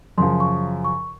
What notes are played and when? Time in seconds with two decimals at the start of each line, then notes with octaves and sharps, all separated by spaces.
0.18 F#2 C#3 F3 C6
0.40 C#6
0.85 C#6